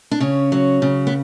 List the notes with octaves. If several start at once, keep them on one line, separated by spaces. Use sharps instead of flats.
D4
C#3 C#4
F#3
C#3
B3